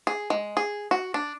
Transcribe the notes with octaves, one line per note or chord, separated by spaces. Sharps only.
G#4
G#3
G#4
F#4
D4